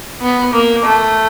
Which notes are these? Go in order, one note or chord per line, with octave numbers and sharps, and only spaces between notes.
B3
A#3
A3